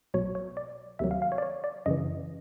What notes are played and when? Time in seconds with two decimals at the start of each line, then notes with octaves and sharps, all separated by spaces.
0.14 B1 B2 F#3 C#5
0.35 C#5
0.57 D5
0.99 D2 C3 D#3 F#3 E5
1.11 F5
1.22 F5
1.32 C#5
1.38 D5
1.42 C#5
1.64 D5
1.86 F#2 C#3 E3 D#5